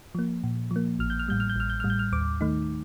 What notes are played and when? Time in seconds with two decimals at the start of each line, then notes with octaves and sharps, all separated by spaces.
0.15 F3 A#3
0.44 A#2
0.71 F3
0.76 A#3
0.99 A1 F6
1.10 G6
1.19 F6
1.28 A2 G3 G6
1.40 F6
1.49 G6
1.56 A1 F6
1.70 G6
1.80 A2 G3 F6
1.90 G6
1.99 F6
2.12 D#2 D6
2.41 D#3 A3 D#4